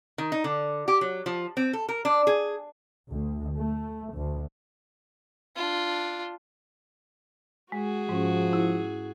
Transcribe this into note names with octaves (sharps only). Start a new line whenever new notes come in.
D#3
D#4
D3
G4
F#3
F3
C4
A4
A#4
D4
G#4
D2
A3
D2
D4 F4
G#3 F#4 G#4
G#2 F3 C#4
E4